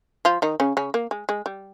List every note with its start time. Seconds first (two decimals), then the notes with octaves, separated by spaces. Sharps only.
0.25 F3 F4
0.42 D#3 D#4
0.60 C#3 C#4
0.77 C#3 C#4
0.94 A#3
1.11 G#3
1.29 G#3
1.46 G3